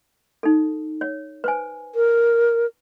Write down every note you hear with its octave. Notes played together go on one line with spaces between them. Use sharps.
D#4 A4
C#5
B4 C5 G#5
A#4